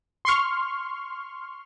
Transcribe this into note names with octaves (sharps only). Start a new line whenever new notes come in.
C6 C#6 F6